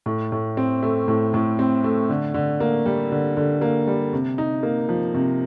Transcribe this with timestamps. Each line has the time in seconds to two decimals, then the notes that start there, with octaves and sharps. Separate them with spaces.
0.06 A2
0.32 A2
0.57 C4
0.83 A3
1.08 A2
1.34 A2
1.59 C4
1.84 A3
2.09 D3
2.34 D3
2.60 A#3
2.86 G3
3.12 D3
3.37 D3
3.61 A#3
3.87 G3
4.13 C3
4.38 D#4
4.63 A#3
4.89 F3
5.14 C3